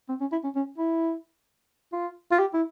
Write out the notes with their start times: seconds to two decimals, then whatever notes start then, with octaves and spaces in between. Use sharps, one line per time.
0.09 C4
0.21 C#4
0.32 E4
0.44 C#4
0.55 C#4
0.78 E4
1.93 F4
2.31 F4
2.39 G4
2.54 E4